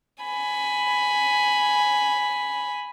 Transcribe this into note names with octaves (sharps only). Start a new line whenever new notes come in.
G#5 B5